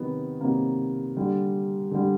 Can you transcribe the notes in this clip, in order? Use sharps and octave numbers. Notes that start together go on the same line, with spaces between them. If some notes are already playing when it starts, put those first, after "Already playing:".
Already playing: C3 D#3 F#3 B3
C3 D#3 F#3 A#3
D3 G3
D3 G3